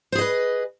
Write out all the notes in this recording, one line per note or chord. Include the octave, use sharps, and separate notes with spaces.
G#4 B4 C5 D#5